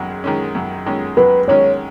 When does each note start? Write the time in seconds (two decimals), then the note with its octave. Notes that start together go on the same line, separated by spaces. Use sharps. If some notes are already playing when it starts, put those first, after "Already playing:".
Already playing: F#2 D#3 G#3 C#4
0.24 D#3 G#3 C#4
0.55 F#2
0.86 D#3 G#3 C#4
1.17 F#2 B4
1.48 D#3 G#3 C#4 C#5